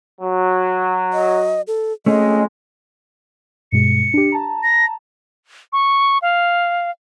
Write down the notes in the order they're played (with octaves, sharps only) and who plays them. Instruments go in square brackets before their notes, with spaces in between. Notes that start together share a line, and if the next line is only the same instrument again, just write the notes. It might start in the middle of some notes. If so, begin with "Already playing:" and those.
[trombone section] F#3
[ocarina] D#5
A4
[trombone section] F2 G#3 [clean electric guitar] A3 C#4 G#4 [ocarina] D#5
[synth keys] G2 B2 G#3 [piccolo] C#7
[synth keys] D4 G4
A5 A#5
[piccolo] A#6
C#6
F5